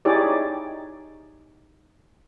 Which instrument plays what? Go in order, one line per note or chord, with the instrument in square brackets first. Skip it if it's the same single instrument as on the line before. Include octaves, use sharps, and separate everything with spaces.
[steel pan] D#4 E4 G4 G#4 C#5 D5